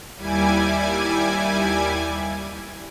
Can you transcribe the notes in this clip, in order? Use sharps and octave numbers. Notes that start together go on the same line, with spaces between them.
D#2 G3 E4 G#5 D6 G#6